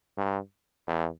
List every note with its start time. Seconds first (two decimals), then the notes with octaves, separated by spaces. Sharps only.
0.17 G2
0.87 E2